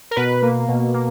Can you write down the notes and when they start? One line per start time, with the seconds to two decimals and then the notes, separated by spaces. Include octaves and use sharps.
0.11 A#4
0.16 B2 B4
0.42 A#3
0.68 B2
0.94 A#3